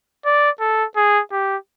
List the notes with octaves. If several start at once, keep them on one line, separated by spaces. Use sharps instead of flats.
D5
A4
G#4
G4